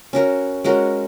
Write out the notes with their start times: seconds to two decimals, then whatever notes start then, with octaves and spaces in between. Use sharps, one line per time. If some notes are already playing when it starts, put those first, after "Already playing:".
0.13 C#4 F#4 A#4
0.64 G#3 C#4 F#4 A#4